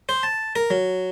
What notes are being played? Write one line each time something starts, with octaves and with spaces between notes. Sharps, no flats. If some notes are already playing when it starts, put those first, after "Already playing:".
C5
A5
A#4
F#3